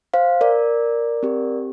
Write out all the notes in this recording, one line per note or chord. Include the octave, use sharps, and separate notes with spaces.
C5 F5
A#4 D5
C4 G4